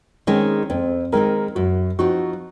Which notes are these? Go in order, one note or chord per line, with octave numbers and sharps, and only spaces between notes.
D#3 G#3 C4 C#4 D#4
F2 C4
D#3 G#3 C4 D#4 A#4
F#2 F#4
F3 C4 D#4 F#4